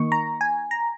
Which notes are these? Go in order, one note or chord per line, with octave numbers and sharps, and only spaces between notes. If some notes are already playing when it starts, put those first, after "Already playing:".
Already playing: D#3 A#3 D#4 C#6
A#5
G#5
A#5